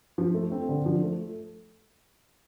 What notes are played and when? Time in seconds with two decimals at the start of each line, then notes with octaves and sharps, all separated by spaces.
0.18 F3
0.34 A3
0.52 C4
0.69 D3
0.86 F3
1.03 A3